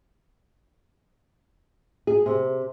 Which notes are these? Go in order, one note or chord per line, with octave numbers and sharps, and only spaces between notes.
G#4
C3